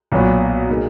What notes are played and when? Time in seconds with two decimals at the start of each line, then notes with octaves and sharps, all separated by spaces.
0.12 B1 A#2 F#3 B3 F#4
0.70 A#2 G#3 D#4 A#4